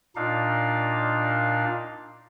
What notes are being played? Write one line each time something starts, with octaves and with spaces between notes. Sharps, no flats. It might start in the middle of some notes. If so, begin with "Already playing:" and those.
A#2 D4 D#4 F5